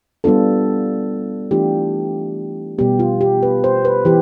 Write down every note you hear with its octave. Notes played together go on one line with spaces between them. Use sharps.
G3 B3 D4 F4 A4
E3 A3 D4 F4 G4
B2 G3 B3 G4
F4
G4
B4
C5
B4
E3 G4